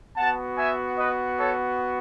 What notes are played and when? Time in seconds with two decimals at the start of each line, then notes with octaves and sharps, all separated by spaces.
0.17 B3 F#4 F#5 A5
0.57 E5 G#5
0.98 B4 D#5
1.37 A4 C#5